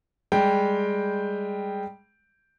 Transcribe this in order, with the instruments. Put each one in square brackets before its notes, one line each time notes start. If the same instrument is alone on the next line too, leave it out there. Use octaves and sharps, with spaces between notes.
[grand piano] G3 G#3 G5